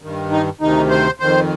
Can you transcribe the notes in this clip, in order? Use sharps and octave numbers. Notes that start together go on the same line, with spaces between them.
G2 D#3
D#4
D2 C3 D#3 D#4
C5
F2 D#3 C5